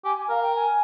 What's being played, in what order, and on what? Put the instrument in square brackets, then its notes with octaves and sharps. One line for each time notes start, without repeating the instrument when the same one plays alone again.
[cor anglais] G4 [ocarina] G#5
[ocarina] G#5
[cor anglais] A#4 [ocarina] F5
[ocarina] G5
G#5